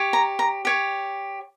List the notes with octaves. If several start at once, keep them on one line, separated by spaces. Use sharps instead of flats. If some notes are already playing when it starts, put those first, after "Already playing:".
Already playing: G4 C#5
A#5
A#5
G4 C#5